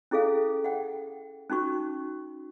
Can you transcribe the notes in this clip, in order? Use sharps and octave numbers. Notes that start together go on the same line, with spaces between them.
C#4 E4 G#4 A4 F5
F#5 G5
C#4 D#4 F#4 C#6